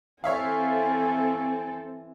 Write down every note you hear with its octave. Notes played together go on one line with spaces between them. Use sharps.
E3 C4 A4 C#5 E5 F5 G#5